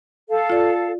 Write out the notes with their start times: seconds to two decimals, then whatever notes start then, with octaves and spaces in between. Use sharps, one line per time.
0.30 A4 F5
0.50 F4 D5